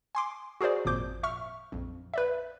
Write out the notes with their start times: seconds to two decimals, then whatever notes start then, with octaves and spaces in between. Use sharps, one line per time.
0.15 G#5 C6 D6
0.61 F#4 G#4 A#4 C5 D5
0.85 G#1 F2 A#2 F3 D6 G6
1.23 E5 C#6 F6
1.72 A#1 F2
2.14 B4 D5 E5